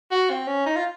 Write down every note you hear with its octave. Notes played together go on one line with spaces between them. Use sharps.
F#4
C4
C#4
D#4
F4